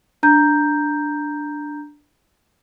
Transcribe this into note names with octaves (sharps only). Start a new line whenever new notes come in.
D4 A#5 G6